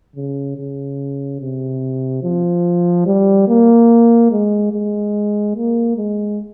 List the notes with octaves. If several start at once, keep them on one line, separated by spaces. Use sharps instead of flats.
C#3
C#3
C3
F3
G3
A#3
G#3
G#3
A#3
G#3